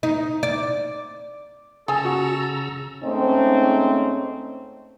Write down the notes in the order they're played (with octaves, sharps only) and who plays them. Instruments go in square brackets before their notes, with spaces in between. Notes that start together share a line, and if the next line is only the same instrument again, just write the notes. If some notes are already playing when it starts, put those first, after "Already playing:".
[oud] D#4
D5
[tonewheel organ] C#3 A#5 E6 [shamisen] G#4 G#5 [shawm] A4
[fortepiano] F#4
[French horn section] G#2 A3 C4 C#4 D#4